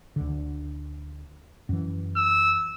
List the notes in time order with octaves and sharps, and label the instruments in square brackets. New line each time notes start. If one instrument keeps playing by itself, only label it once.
[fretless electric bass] D2 D3
F#2 E3
[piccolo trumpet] E6